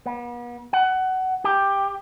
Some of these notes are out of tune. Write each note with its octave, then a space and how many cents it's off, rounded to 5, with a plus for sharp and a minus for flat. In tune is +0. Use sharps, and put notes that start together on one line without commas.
B3 -40
F#5 +20
G4 +10